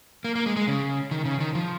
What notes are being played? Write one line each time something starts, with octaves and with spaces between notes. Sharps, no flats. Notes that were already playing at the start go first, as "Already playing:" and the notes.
A#3
A#3
G#3
G#3
C#3
D#3
C#3
D#3
F3